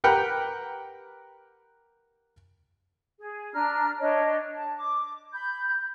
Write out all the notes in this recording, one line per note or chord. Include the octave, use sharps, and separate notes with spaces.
G4 A#4 B4 F#5 G5
G#4
D4 A#5 F6
D4 C#5 D#5
A5
D6
B5 G6